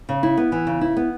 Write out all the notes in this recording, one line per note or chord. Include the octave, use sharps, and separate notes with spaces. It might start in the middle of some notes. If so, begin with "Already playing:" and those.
C#3
E4
B3
E3
C#3
E4
B3